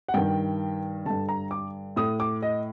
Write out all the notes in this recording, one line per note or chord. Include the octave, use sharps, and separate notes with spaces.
F#5
G2 D#3 G5
G2 D3 A5
A#5
D6
A2 D#6
D6
D#5